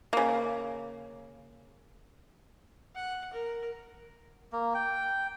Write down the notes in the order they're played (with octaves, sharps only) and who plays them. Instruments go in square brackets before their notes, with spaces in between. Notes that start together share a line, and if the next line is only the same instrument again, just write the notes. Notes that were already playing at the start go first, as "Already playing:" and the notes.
[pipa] C#3 A#3
[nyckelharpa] F#5
A#4
[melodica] A#3
G5